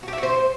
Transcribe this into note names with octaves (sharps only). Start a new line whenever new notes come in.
F#4
G4
E5
F#4
C5